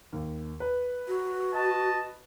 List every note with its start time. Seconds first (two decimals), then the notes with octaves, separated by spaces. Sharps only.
0.13 D#2
0.60 B4
1.08 F#4
1.53 D#5 A5